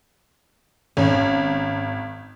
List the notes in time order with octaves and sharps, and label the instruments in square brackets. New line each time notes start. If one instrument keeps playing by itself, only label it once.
[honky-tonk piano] G#1 [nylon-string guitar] C#4